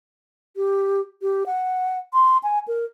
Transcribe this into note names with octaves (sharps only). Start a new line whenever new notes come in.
G4
G4
F#5
C6
G#5
A#4